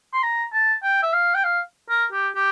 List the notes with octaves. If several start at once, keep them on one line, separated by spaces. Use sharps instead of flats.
C6
A#5
A5
G5
E5
F5
G5
F5
A#4
G4
G4